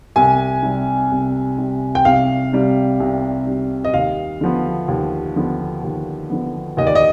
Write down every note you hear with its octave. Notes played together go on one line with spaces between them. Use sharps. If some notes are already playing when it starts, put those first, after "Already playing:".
C2 G#5
C3 G3
C2
C3 G3
G5
C2 F5
C3 G3
C2
C3 G3
D#5
D#2 F5
D3 F3 B3
D#2
D3 F3 B3
D#2
D3 F3 B3
D#2 D#5
D5
D#5